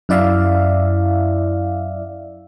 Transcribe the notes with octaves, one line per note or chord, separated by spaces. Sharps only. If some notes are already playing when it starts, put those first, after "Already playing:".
F#2 E4 D5 E5 F5